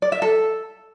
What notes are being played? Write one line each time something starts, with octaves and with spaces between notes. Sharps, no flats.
D5
E5
A4